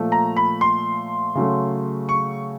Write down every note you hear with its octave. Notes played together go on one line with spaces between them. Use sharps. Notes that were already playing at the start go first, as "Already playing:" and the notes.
Already playing: A#2 F3 A3
A#5
B5
C6
C#3 F#3 A3
C#6